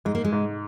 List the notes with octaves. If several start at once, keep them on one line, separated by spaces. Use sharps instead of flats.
G#2 G#3
A#3
G#3
G#2